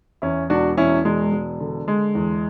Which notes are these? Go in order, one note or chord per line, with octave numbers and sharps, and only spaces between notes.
E2 C#4 E4
E1 D4 F#4
E2 C#4 E4
E1 G#3
E1
D3
D3 G#3
E2